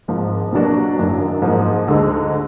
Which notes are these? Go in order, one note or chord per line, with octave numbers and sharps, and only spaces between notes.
G#1 G#2 F3
B2 F#3 A#3 D4 F#4
F#1 F#2 D#3 F#3 D4
G#2 F3 A#3 D#4
D2 D3 G#3 D#4